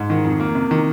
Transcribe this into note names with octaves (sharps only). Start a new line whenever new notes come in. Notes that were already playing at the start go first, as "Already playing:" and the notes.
Already playing: G#2
D#3
F2
A#3
C3
D#3